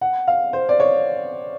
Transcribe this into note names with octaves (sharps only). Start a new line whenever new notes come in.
F#5
F5
C5
D5
C#5